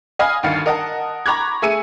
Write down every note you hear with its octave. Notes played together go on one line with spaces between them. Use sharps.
D#5 F5 G#5 B5 D#6 F6
D2 G2 D#3 F5 A6 C#7
A#4 D#5 F#5 A5
A#5 B5 C#6 D6 F#6 G#6
A3 G#4 E6 C#7 D#7